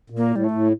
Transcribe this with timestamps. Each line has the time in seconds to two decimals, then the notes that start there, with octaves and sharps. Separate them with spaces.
0.10 A#2
0.17 A#3
0.30 A2
0.36 G3
0.44 A3
0.51 A2